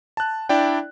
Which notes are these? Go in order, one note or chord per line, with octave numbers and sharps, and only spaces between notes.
A5 F#6
D4 E4 D5 G5